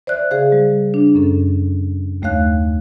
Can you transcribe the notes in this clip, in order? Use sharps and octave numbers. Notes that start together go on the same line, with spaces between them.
C5 D5 E5 F#6
C#3 G#4 C5 F5
G3
D4
F#2 C#4 A4
D#2 A3 C#5 F5 F#6